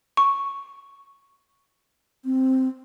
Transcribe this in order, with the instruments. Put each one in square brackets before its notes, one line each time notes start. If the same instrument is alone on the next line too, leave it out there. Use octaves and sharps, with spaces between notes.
[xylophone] C#6
[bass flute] C4